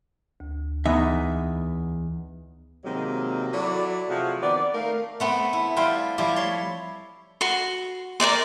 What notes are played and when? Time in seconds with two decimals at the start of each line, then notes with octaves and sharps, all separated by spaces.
0.40 D2
0.85 E2 B3 D#4 E5
2.84 C3 D#3 F#3 G#3 A#3 C4
3.53 F#3 E4 A4 D5
4.09 C3 F3 A3 F4 F#4 G#4
4.42 D#3 B3 C4 D5
4.74 A3 D#4 A#4 F5
5.20 A3 B3 C4
5.53 E4
5.76 G3 E4 F4 C5 G5
6.18 F3 G3 E4 G4
6.36 C#5 C6
7.41 F#4 C6
8.20 A#4 C5 D5 C6